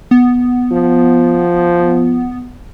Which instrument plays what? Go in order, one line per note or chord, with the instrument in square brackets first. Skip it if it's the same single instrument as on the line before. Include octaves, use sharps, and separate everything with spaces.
[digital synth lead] B3
[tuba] F3